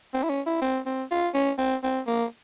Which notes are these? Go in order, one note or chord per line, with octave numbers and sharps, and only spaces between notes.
C4
E4
C#4
E4
C4
C4
F4
C#4
C4
C4
A#3